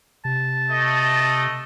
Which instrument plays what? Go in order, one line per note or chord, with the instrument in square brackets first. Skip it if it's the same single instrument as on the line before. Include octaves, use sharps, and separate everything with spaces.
[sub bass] C3 [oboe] A5
[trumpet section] A3 D#5